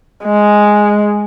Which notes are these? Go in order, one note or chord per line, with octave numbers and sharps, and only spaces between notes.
G#3